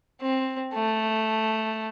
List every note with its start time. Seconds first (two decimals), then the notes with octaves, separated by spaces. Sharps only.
0.21 C4
0.74 A3